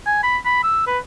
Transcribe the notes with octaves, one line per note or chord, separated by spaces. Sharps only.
G#5
B5
B5
E6
B4